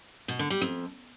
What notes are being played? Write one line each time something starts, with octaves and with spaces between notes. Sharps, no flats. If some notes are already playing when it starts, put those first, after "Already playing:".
B2
D3
G3
F2